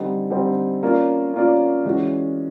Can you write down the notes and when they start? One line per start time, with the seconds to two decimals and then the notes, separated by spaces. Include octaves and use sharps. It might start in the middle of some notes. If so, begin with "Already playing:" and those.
Already playing: D3 G3 C4 D#4
0.30 D3 G3 C4 D#4
0.83 A#3 C#4 F4 A#4 D5
1.34 A#3 C#4 F4 A#4 D5
1.85 E3 G#3 C#4 F#4